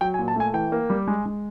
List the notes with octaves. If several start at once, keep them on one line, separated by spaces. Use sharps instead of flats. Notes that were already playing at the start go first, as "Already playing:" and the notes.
F#3 G5
G#5
A#2
A5
A3 G#5
E3 G5
A#3
G3
G#3
G#3